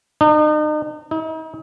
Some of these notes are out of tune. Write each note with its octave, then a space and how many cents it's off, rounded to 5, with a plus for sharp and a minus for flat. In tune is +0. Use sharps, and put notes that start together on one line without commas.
D#4 -40
D#4 +40